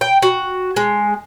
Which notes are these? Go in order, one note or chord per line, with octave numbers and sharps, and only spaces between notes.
G5
F#4
G#3